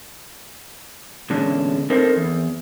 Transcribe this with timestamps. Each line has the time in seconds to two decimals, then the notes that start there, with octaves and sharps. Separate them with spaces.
1.30 E2 A#2 D3 G#3 C#4 D4
1.90 C4 D#4 A4 A#4 C5
2.17 E2